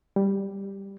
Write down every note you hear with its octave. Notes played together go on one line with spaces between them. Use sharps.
G3